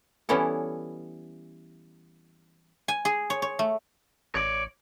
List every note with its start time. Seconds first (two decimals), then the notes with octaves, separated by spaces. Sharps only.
0.29 E3 G3 B3 C#4 E4 A4
2.88 G#5
3.05 G#4
3.30 C#5
3.42 C#5
3.59 A3
4.35 A1 C#5 D5